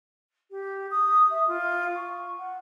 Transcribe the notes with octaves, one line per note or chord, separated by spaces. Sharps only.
G4
D#6
E5
F4
C#6
F#5